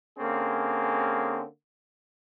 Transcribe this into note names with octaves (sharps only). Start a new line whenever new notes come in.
D3 A#3 C4 C#4 G#4